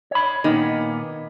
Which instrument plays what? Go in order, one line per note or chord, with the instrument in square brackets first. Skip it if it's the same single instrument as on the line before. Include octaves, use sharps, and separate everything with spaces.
[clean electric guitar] C#5 B5
[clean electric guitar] A#2 B3 [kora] D#3